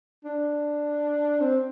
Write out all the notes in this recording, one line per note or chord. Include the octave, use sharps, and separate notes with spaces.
D4
C4